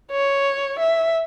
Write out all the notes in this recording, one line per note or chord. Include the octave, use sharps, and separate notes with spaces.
C#5
E5